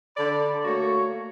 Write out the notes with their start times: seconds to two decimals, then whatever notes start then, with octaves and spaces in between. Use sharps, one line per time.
0.17 D3 A4 D5 B5
0.64 A3 A#3 F#4 C#5